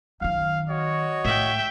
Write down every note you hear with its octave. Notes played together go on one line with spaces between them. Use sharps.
F#2 D#3 F5
F#4 C#5 D#5
A2 E5 G5